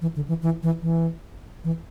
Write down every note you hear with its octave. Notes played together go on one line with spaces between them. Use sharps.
E3
D3
E3
E3
E3
E3
E3